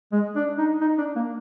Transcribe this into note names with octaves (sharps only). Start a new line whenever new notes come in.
G#3
D4
D#4
D#4
D4
A#3